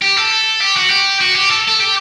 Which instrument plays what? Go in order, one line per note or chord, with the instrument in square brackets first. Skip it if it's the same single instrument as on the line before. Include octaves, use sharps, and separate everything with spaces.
[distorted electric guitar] G4
A4
G4
F#4
G4
F#4
G4
A4
A4
G4